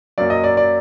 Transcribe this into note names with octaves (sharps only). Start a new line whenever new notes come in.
F#2 F#3 A#3 D5
D#5
D5
D5